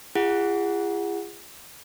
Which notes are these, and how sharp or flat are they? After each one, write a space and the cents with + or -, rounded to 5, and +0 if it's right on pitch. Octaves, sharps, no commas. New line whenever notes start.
F4 -45 G#4 -30 F#5 +0